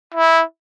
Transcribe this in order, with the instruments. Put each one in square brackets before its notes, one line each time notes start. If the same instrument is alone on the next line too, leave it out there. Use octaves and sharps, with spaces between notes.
[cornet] E4